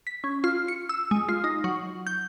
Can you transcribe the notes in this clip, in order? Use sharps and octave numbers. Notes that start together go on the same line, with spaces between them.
B6
C#4
F4
C#7
E6
G#3
F4
D#4
F#3
G6